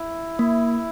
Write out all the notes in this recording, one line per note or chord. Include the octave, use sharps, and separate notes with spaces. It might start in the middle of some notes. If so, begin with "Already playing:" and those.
Already playing: E4
A#3